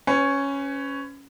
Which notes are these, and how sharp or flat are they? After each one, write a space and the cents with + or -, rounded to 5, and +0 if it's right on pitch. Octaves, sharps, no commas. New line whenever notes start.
C#4 +0 B4 +35